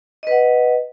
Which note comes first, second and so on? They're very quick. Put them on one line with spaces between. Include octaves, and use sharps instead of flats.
D#5 B4 F#5